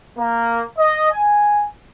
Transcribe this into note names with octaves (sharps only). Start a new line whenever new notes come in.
A#3
D#5
G#5